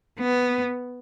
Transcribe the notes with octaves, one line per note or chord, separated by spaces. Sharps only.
B3